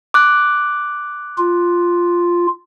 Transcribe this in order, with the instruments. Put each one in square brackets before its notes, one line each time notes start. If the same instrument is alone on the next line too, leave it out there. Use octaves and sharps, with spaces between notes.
[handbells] D6 F#6
[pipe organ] F4